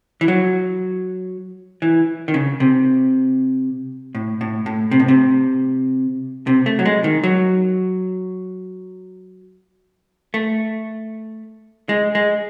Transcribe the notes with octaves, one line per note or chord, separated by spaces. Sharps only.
E3
F#3
E3
D#3
C#3
C3
A2
A2
A2
C3
A2
C3
C3
A3
F#3
G#3
D#3
F#3
A3
G#3
G#3